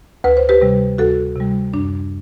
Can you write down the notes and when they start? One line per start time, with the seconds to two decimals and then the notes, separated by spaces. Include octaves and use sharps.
0.24 D2 B4
0.37 C5
0.49 G4 B4
0.62 C3 G3
0.98 D2 F#4 A4
1.36 C3 G3
1.73 F#2 D4